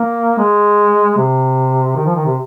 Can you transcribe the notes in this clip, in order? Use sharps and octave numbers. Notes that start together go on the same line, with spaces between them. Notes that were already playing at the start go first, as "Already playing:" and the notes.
Already playing: A#3
G#3
C3
D#3
F3
D#3
C3